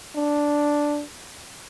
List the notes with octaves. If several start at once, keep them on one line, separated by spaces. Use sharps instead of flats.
D4